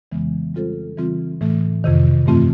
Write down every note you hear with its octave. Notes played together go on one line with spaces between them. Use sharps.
F2 C#3 E3 G#3 B3
G3 C4 F4 A4 C5
C#3 E3 G3 C4 F4
A2 E3 A3
F2 C3 D#3
G2 E3 A3 C4 F4